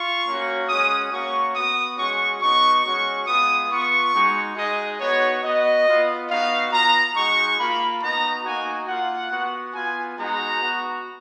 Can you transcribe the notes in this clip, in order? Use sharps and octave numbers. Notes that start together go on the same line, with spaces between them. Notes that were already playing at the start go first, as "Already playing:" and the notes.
Already playing: F4 C#6
A#3 C#4 F#4
G#3 C#4 F#4 D#6
A#3 C#4 F#4 C#6
B3 F#4 D#6
G#3 C#4 F#4 C#6
B3 D#4 F#4 C#6
G#3 C#4 F#4 C#6
G#3 B3 F4 D#6
B3 F4 C#6
G#3 D#4 F#4
G#3 D#4 F#4 D#5
B3 D#4 F#4 C#5
B3 F#4 D#5
B3 F4
B3 D#4 F#4 F5
B3 F4 A#5
G#3 D#4 F#4 C#6
A#3 F4 B5
B3 D#4 F#4 A#5
A#3 D#4 F#4 G#5
A#3 F4 F#5
B3 F#4
B3 F4 G#5
G#3 B3 D#4 F#4 A#5
B3 F#4